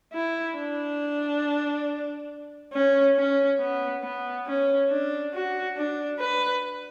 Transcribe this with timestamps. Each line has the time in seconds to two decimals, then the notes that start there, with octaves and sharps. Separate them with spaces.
0.13 E4
0.56 D4
2.73 C#4
3.16 C#4
3.60 B3
4.03 B3
4.47 C#4
4.90 D4
5.34 F#4
5.77 D4
6.20 B4